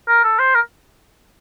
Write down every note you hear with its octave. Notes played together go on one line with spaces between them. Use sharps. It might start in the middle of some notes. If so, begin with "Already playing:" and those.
A#4
A4
C5
A#4